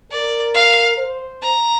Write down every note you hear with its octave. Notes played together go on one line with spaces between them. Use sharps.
A#4 D5
F5
C5
A#5